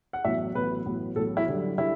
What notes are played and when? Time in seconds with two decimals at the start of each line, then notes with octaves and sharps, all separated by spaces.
0.13 F#5
0.24 A1 A2 F#3 B3 E5
0.55 A1 A2 F#3 B3 B4
0.85 A1 A2 F#3 B3
1.16 A1 A2 F#3 B3 A4
1.37 E4
1.47 F#2 D3 G3
1.77 D3 G3 E4